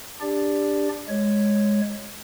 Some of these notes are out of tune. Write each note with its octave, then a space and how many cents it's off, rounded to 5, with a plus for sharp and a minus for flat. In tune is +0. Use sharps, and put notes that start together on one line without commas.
D4 +0 G4 +15 D5 +0
G#3 +0 C#5 +0